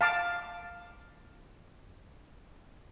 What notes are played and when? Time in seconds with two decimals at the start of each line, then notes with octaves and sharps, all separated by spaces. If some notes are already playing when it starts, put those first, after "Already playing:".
0.01 F5 A5 D6